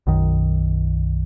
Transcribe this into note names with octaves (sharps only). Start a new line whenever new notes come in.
B1 F#2 D#3